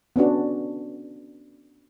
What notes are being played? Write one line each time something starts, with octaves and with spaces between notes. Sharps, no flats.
B3 C#4 D4 F#4